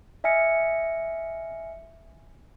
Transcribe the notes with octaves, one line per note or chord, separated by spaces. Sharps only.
D#5 E5 G#5 F6 C#7